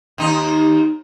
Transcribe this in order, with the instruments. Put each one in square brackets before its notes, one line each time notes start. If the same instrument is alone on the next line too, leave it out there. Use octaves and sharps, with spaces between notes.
[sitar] D#2 D#4